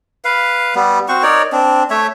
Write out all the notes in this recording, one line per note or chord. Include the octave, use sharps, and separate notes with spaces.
B4 F5
G3 B3
C4 F#4 C5 C#6
D#4 A#4 C#5 D5
C4 D4
A3 C#5 E5